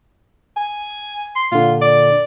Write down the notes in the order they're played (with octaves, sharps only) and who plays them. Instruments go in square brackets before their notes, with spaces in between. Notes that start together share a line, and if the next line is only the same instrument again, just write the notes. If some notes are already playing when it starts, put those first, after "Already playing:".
[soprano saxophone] G#5
C6
[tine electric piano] A#2 D3 [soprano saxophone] F4
[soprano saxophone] D5